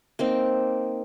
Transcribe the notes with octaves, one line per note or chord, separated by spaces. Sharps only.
A#3 C4 D#4